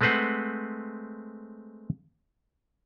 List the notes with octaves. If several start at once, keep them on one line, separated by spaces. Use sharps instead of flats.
G#3 A3 C4 B4 C5 F#5